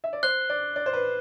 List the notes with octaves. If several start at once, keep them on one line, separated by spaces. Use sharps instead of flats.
E5
D5
C5 F#6 C7 G7
D5
D5
C5
B4